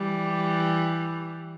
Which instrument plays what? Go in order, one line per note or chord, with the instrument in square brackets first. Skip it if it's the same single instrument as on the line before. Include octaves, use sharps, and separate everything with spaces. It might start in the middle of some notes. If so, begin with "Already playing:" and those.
Already playing: [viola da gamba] E3 G3